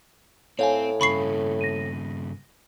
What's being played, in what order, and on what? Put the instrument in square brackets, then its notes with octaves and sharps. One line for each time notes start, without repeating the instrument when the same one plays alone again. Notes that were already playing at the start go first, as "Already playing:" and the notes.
[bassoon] A2 [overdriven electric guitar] C4 [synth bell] C#5 F5 G#5
[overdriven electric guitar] G2 C#3 [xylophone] B5 C#6 C7
[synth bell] A#6 D#7